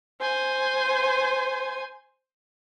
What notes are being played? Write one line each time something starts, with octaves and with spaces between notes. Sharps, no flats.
C5 G#5